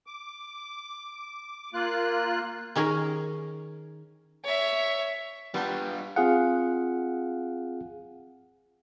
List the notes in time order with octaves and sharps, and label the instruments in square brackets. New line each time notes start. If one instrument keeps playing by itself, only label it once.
[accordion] D6
A#3 F4 F#6
[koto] D#3 C#4 G#4 A#4
[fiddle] C#5 E5
[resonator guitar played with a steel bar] G3 [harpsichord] B3 C5 A5 [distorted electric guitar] D4 F4
[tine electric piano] C4 F4 G#4 F5 F#5